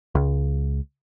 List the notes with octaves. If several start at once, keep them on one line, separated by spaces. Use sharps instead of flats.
C#2